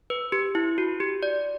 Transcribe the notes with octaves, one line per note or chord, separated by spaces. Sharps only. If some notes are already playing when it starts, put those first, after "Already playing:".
B4
G4
E4
F#4
G4
D5